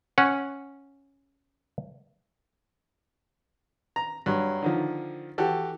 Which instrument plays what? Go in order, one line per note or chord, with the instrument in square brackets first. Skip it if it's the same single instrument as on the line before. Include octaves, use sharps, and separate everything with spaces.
[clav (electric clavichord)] C#4 F#5
[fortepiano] A#5
G2 F#3
D3 D#3 F3
E3 F#4 G4 A4